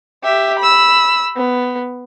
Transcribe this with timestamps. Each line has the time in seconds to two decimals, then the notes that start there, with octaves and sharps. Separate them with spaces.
0.23 G4 E5
0.59 B5 E6
1.37 B3